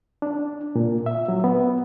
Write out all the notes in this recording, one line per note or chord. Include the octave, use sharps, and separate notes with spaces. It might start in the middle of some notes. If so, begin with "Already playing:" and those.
D4
A#2
E5
F#3
B3